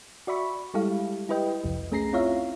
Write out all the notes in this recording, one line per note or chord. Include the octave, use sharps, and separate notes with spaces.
F#4 D5 E5 B5 C#6
G3 G#3 E4 G4 A4 F5
E4 G4 B4 D#5 G5
G1 C2 F2
A3 C#4 G#4 A#5 A#6 C7
C4 E4 F4 C#5 E5 F5